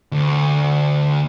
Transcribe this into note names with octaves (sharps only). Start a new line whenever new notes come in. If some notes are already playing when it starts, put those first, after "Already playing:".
D2